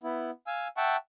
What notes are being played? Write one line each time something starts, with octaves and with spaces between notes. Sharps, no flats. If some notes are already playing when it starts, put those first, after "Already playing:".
B3 E4
F5 G#5 E6
E5 F#5 G5 A5 C#6